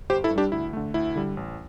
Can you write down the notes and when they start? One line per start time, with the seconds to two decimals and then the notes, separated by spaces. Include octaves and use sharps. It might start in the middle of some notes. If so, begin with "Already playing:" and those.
0.10 G1 G4 C5
0.24 E4 A4
0.31 G2
0.36 G3 D4 G4
0.52 D2 E4
0.73 D3 A3
0.94 D2 E4
1.16 D3 G3
1.37 A1